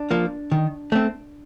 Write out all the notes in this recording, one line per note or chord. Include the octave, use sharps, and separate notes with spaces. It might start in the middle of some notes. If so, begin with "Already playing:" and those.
Already playing: D4
F3 A#3
D#3
A3 C4